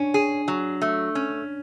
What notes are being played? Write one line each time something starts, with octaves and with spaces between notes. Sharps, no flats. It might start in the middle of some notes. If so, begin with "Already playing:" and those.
Already playing: C#4 D4
G#4
F#3
A3
C#4